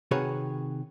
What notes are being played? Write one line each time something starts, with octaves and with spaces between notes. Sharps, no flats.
C3 D#3 F#4 G#4 B4 C#5